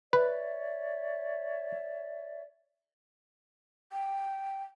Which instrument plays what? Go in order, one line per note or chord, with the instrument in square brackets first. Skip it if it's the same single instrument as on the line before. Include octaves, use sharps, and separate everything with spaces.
[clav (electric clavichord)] B4 [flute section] C#5 D5 E5
[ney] G5